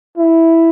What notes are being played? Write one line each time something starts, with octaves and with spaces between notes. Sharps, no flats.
E4